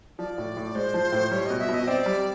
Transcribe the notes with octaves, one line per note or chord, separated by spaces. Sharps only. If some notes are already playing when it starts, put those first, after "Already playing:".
F3 D5
A2
A2
G#3 C5
F3
A2
G3 C#5
B2 D#5
E5
B2
D#5
C4 D5
G3